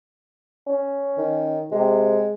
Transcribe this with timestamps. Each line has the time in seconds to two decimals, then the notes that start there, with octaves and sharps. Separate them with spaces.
0.67 C#4
1.18 D#3
1.72 C3 G#3